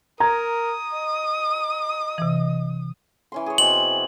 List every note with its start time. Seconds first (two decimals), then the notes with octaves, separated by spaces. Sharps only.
0.20 A#4 A#5 D#6 G#6
0.93 D#5
2.18 C3 E3
3.32 E3 C#4 C6
3.46 G#4 C#5
3.58 B2 C4 F#7